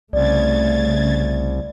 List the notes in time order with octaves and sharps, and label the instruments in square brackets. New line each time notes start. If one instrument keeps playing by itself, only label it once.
[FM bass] C2 [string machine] C#3 G#6 A6 [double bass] A3 [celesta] D5